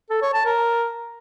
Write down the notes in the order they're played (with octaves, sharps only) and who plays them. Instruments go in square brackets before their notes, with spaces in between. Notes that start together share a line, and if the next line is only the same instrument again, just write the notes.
[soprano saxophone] A4
C#5
A5
A#4